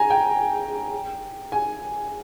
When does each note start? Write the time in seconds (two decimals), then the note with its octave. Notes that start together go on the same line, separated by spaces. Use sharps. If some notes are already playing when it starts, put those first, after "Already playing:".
Already playing: G#5 A#5
0.10 G5
1.52 G#5